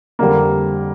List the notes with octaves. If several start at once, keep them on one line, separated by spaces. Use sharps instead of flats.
F2 D3 G3 A#3